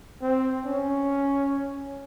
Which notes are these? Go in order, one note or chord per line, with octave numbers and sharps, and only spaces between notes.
C4
C#4